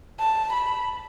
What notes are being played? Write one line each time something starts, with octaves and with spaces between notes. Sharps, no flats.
A5
B5